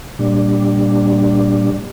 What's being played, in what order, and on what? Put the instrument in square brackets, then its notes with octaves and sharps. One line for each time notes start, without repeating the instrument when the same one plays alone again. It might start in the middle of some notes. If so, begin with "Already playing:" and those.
[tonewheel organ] A#2 G3 D4